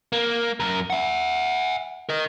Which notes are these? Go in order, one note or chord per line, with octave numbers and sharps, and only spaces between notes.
A#3
F#2 A#4
E5 F#5
A#4 D#5